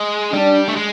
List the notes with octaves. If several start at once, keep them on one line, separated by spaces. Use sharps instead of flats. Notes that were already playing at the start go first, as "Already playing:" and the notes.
Already playing: G#3
G3 D4
A3
G#3